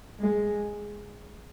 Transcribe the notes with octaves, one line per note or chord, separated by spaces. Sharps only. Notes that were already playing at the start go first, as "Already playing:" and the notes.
G#3